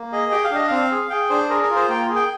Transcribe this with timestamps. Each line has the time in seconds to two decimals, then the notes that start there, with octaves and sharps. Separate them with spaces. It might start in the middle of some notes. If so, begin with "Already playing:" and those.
Already playing: A#3
0.12 G#4 D#5
0.32 G4 G5
0.44 F5
0.51 D4 D#5
0.68 C4 F5
0.91 G#4
1.10 G#4 G5
1.30 D4 C5
1.49 G#4 A#4
1.62 A#4
1.70 F4
1.76 C5
1.89 A#3 G5
2.09 G#4
2.16 G5